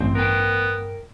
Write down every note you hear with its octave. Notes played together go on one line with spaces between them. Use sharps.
A1 G2 C4
B3 A#4 G5